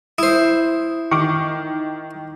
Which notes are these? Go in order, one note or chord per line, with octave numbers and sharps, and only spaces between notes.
E4 C5 D#6
D#3 C#6 D6